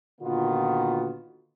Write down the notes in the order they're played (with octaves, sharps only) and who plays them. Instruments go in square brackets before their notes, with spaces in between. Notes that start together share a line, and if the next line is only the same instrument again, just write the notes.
[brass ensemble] A#2 D3 D#3 B3 F4 F#4